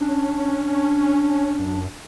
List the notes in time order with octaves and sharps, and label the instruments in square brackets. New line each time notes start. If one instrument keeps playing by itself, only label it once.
[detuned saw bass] C#4 [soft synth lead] D4
[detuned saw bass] F#2